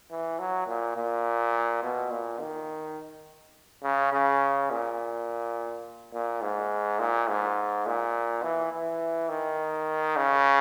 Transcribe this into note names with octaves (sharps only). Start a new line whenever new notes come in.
E3
F#3
A#2
A#2
B2
A#2
D#3
C#3
C#3
A#2
A#2
G#2
A#2
G#2
A#2
E3
E3
D#3
C#3